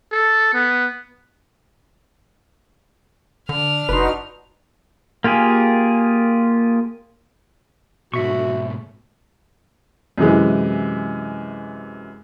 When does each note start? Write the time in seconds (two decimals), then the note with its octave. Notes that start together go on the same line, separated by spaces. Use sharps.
0.11 A4
0.53 B3
3.49 D3 D4 F6
3.89 F#1 D#4 F#4 B4 C6
5.24 A#3 F4 G4 G#4
8.14 G#2 B2 F#4 E5 C#6
10.18 F#2 C3 E3 G#3